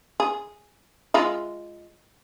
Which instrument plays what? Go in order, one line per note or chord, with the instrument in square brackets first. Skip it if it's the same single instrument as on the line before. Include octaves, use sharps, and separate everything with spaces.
[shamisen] G#4
G#3 F4 E5